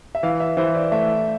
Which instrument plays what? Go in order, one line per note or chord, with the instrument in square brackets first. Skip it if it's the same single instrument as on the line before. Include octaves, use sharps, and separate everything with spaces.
[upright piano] E5
[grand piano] E3 [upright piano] F5
[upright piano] E5
[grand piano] E3 [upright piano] C5
[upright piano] D5
[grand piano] A3 [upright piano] E5